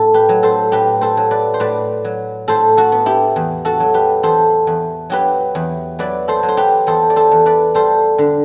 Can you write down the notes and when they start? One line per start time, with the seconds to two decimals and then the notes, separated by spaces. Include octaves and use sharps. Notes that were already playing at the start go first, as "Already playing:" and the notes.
Already playing: A2 A4
0.14 G4 B4
0.29 F#3
0.43 A4 C5
0.72 A2 G4 B4
1.01 A4 C5
1.17 F#3
1.31 B4 D5
1.54 C5
1.60 A2 B4 D5
2.05 F#3
2.48 A2 A4 C5
2.77 F#4 A4
2.92 B3
3.06 E4 G4
3.36 E2
3.65 F#4 A4
3.80 F#3
3.94 G4 B4
4.23 E2 A4 C5
4.67 E2
5.10 F#3 G4 B4
5.55 E2
5.99 F#3 B4 D5
6.28 A4 C5
6.43 F#3
6.48 C5
6.57 G4 B4
6.87 E2 A4 C5
7.10 D5
7.16 A4 C5
7.31 E2
7.46 B4 D5
7.75 G3 A4 C5
8.18 D3